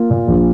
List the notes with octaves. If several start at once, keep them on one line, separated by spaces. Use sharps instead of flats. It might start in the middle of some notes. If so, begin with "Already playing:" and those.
Already playing: A#3 F4
A#2
A#1